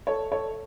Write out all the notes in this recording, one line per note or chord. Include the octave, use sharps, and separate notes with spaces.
A4 C#5
A4 C#5